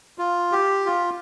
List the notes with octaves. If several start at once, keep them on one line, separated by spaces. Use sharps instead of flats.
F4
G4
F4